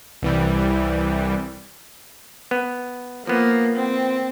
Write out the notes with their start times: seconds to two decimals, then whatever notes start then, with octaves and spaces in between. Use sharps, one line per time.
0.23 C2 E3 G3
2.51 B3
3.27 F3 A#3 B3
3.76 C4